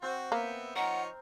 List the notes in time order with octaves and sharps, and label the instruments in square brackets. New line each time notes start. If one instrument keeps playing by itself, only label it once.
[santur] C4 G5 [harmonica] F#4
[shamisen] A#3 [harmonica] B3 E5
[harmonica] F3 D#4 C#5 [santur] A#4 [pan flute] F#5